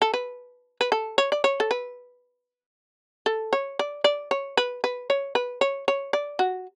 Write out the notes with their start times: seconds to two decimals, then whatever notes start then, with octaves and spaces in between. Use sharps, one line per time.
0.02 A4
0.14 B4
0.81 B4
0.92 A4
1.18 C#5
1.32 D5
1.44 C#5
1.60 A4
1.71 B4
3.26 A4
3.53 C#5
3.79 D5
4.04 D5
4.31 C#5
4.57 B4
4.84 B4
5.10 C#5
5.35 B4
5.61 C#5
5.88 C#5
6.13 D5
6.39 F#4